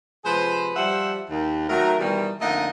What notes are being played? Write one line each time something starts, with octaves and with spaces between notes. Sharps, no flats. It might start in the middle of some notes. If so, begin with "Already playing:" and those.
C3 F3 G#3 G#4 B4 C5
F3 G3 C5 E5 F#5
D#2
D#3 F#3 A3 A#4
B2 D#3 E3 G3
F2 D3 A3 A#3 D#4 D#5